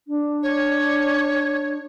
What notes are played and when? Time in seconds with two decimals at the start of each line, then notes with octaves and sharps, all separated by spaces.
0.08 D4
0.43 C#5